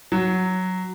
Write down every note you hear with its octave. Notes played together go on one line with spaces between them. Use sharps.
F#3